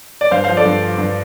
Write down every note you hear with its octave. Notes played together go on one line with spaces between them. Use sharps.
D5
G2 C5 F5
F3 C5 F5
A4 D5
G2
F3
G2